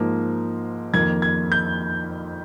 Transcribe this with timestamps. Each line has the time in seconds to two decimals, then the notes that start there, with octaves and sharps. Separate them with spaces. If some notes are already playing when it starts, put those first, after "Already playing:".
Already playing: G#2 F3 A#3
0.94 F2 D#3 A#3 G#6
1.22 G#6
1.52 G6